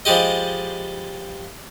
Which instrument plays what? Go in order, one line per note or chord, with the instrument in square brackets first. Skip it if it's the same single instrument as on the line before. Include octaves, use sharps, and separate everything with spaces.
[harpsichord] F3 G3 G#3 G4 D#5